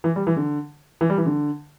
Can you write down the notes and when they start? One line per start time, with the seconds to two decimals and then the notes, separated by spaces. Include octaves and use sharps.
0.04 E3
0.16 G3
0.27 E3
0.37 D3
1.01 E3
1.10 G3
1.18 E3
1.26 D3